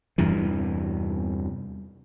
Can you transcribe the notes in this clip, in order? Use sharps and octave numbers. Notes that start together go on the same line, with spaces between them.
E2 G2 C3 E3